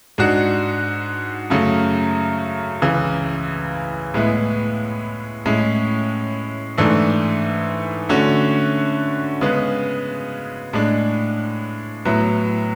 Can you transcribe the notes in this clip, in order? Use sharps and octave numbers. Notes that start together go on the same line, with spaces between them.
G#2 G#3 D4 F#4
F#2 C#3 F#3 A3
C#2 C#3 E3
A2 G#3 B3 E4
A2 G#3 C#4 E4
G#2 E3 A3 D4
D3 A3 C#4 F#4
C#3 G#3 B3
A2 G#3 D4
A2 F#3 B3 E4